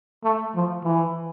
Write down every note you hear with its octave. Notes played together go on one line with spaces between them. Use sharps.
A3
F3
E3